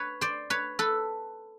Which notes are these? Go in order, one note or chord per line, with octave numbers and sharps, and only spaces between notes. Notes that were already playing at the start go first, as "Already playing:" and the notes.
Already playing: B4 C#5
C5 D5
B4 C#5
A4 B4